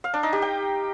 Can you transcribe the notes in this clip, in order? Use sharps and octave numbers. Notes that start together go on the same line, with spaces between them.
F5
D4
D#4
G4
G5